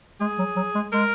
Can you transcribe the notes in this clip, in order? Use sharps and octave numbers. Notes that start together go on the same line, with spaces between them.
G#3 G#4
F#3
F#3
G#3
G#3 A#4